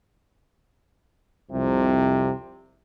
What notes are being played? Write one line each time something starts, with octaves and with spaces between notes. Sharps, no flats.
C2 F2 C3